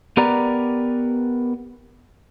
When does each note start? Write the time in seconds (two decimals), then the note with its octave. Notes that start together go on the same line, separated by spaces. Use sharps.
0.17 B3 G4 A#4 B4 D5 A#5